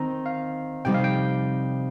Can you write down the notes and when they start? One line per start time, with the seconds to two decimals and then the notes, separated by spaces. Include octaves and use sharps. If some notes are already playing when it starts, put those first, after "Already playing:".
Already playing: D#3 C4 D#4 A#5
0.26 F5
0.85 F2 C3 G3 D#4 C5 G5
0.94 F5
1.04 G5